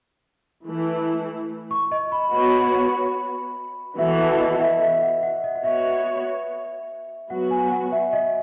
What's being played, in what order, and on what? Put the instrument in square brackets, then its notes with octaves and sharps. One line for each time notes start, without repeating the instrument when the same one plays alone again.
[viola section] E3 A3 E4
[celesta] C#6
D#5
B5
[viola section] B3 F#4 C#5 [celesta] B5
[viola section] E3 B3 F#4 A4 [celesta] E5
[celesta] F#5
D#5
E5
E5
F#5
F#5
D#5
F#5
[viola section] B3 F#4 C#5 [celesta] E5
[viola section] F#3 B3 F#4 [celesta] F#5
[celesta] G#5
F#5
E5
D#5